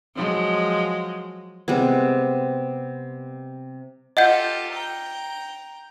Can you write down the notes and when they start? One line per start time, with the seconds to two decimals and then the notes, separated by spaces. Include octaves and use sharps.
0.15 F3 F#3 G#3
1.68 C3 G3 G#3 B3
4.17 F4 G4 A4 D#5 F#5 G6
4.73 G5 A#5